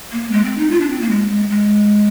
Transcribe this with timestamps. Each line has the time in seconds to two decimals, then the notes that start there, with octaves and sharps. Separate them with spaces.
0.12 A#3
0.32 G#3
0.45 C4
0.58 D#4
0.71 F4
0.81 D4
0.90 C4
1.01 A#3
1.11 G#3
1.30 G#3
1.50 G#3